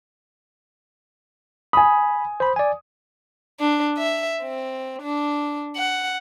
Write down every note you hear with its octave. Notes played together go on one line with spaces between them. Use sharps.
G#5 B5 D#6
C5 B5
D5 G#5
D4
E5
C4
D4
F#5